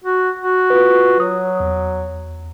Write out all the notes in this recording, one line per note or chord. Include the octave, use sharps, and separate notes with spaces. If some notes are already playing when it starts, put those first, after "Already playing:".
F#4
F#4
F4 B4
F#3 D#6
E2